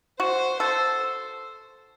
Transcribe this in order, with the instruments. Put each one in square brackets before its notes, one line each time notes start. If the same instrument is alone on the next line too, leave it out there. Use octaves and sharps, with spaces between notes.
[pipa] F#4 [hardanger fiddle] C5
[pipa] A4 [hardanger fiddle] C5